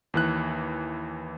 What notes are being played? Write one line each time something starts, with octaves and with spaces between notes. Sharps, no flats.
D#2 E3 F#6